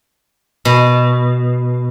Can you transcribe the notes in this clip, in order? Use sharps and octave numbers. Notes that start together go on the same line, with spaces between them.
B2